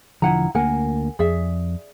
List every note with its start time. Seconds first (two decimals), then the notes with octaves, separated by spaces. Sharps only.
0.22 E1 D3 F3 E4 F#5 A#5
0.55 D2 A#3 A#4 F#5 G#5
1.19 F2 G#4 D5 E5